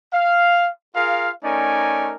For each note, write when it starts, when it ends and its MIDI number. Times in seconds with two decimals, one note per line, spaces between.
0.13 0.68 77
0.96 1.30 65
0.96 1.30 68
0.96 1.30 70
0.96 1.30 77
1.44 2.16 57
1.44 2.16 61
1.44 2.16 63
1.44 2.16 70
1.44 2.16 74
1.44 2.16 80